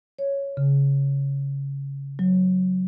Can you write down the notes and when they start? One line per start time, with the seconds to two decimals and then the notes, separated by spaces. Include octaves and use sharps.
0.19 C#5
0.57 C#3
2.19 F#3